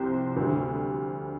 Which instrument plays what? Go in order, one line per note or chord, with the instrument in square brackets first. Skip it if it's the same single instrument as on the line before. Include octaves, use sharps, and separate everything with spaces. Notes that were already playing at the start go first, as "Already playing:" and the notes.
Already playing: [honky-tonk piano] C2 C3 F3 G4 C5
D2 D3 G3